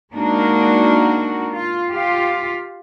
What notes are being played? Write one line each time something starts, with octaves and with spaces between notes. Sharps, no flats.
G#3 A#3 D4 D#4 F#4 A#4
F4
F4 G4 F5